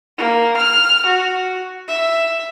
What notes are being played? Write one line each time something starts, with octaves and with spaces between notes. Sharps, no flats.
A#3
F6
F#4
E5